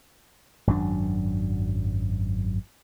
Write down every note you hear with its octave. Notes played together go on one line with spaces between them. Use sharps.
G#1 F#2 F#3 D4